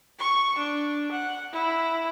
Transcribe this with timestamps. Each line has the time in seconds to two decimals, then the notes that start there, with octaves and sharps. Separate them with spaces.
0.19 C#6
0.58 D4
1.12 F#5
1.52 E4